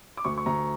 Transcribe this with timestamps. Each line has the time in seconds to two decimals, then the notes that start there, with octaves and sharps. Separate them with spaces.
0.17 D6
0.25 D2 C#6
0.38 C#6
0.46 D2 A#5